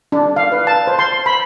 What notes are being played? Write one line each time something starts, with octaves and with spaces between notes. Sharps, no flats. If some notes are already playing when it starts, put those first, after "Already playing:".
D4
F5
B4
A5
C5
C6
B5